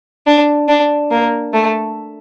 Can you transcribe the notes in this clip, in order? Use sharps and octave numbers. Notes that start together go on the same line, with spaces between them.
D4
D4
A#3
A3